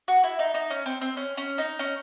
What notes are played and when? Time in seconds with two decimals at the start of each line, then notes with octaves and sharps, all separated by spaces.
0.08 F#4
0.24 E4
0.39 D#4
0.54 D#4
0.70 C#4
0.86 C4
1.01 C4
1.17 C#4
1.37 C#4
1.58 D#4
1.79 C#4